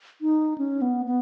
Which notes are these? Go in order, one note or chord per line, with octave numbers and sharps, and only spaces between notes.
D#4
C#4
B3
B3